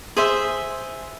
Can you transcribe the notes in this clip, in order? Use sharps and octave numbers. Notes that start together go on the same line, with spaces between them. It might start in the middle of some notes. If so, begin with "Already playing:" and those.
G#4 C5 E5